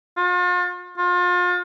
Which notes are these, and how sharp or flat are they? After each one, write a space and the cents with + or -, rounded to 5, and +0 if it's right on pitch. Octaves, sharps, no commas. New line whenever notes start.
F4 +40
F4 +35